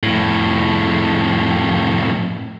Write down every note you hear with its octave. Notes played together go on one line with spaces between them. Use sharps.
F2 A2